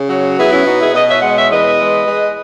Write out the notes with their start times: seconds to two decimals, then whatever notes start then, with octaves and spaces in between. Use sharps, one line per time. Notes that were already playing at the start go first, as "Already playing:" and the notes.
Already playing: C#3
0.09 F#3
0.37 B3 E4 G#4
0.51 C#4 E4
0.66 B2 D#4 F#4
0.79 E4 G#4
0.94 B2 B4 D#5
1.08 C#5 E5
1.22 G#3 D#5 F#5
1.36 C#5 E5
1.50 E2 B4 D#5
1.79 G#3
2.07 G#3